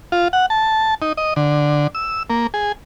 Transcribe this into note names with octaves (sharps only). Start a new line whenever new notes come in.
F4
F#5
A5
D#4
D#5
D3
E6
A#3
G#4